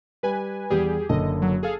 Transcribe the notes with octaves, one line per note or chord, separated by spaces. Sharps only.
G3 B4 G#5
E2 G3 G4 G#4
F#1 D3 A4 D#5
F#3
G#4 A4 F5